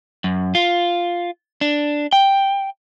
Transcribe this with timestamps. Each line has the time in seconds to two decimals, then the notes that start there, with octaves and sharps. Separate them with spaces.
0.24 F#2
0.55 F4
1.61 D4
2.13 G5